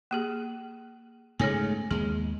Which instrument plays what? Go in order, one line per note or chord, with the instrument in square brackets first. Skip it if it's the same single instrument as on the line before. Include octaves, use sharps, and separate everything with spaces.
[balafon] A#3 G4 G#4
[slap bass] G#2 C#3 A3 [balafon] G#4 C#5 G#5
[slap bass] D#2 G#3 [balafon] G#4